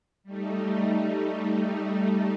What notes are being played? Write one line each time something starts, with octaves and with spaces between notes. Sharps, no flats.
G3 A3 D#4